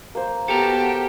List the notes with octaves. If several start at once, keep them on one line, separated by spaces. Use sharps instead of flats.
A#3 C5
B3 F#4 G4 A4 A#4 A5